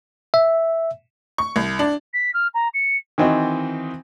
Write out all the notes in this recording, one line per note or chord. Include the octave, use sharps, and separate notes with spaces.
E5
C#6
C2
D4
B6
F6
A#5
C#7
D#3 E3 C4 D#4 F#4